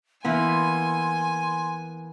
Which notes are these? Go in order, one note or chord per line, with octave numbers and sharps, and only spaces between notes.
E3 A#3 B3 G#5 C6